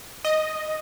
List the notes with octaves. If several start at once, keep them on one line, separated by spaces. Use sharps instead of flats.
D#5